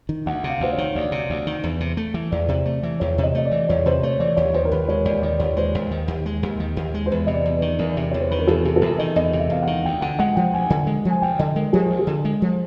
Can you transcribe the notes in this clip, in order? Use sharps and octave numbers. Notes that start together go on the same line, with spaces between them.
D#3
D2 F#5
C3
F5
D2 C5
C#5
D#3
D2 D5
C3
D2
D#3
E2
C3
A3
E3
E2 D5
C3
A3
E3
E2 C#5
C3
D#5
A3 D#5
D5
E3
E2 C#5
C3 C5
A3 C#5
E3 D5
D#2 C#5
D#3 C5
A#4
D#2 B4
G#3 C#5
D#2 D5
D#3 D5
D#2 C#5
G#3 C5
D#2
D#3
D#2
G#3
D#2
D#3
D#2
G#3
C5
E2 B4
C3 D#5
D5
E2
D#3 B4
E2 A#4
C3
E2 C#5
C5
D#3 B4
A#4
E2 A4
C3 G#4
A4
E2 A#4
D#3 D#5
E2 D#5
C3
E5
E2 F5
D#3 F#5
D2 G5
D3 F#5
G#3 F#5
F3 G5
D2 G#5
D3
G#3
F3 G#5
D2 G5
D3 D#5
G#3 A#4
F3 G#4
D2
G#4
D3
G#3
F3